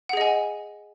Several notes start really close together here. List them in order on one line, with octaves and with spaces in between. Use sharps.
F#5 G#4 D#5 G#5